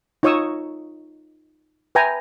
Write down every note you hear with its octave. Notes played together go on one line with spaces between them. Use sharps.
D#4 F4 C#5 C#6 D#6 E6
B4 E5 G5 G#5 A#5